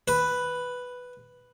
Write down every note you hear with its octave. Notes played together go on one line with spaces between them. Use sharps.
B4